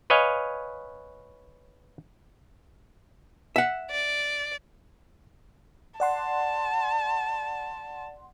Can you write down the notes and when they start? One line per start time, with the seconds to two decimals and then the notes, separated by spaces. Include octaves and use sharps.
0.10 B4 C#5 D#5 F5 G#5
3.56 E5 F#5
3.91 D5
6.00 D5 F#5 A5 C6